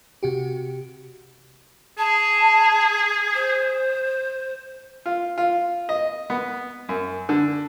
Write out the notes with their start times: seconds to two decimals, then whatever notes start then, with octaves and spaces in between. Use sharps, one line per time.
0.23 C3 F#4 G4
1.98 G#4 A5
3.35 C5
5.06 F4
5.38 F4
5.89 D#5
6.30 B3
6.89 F#2
7.29 D3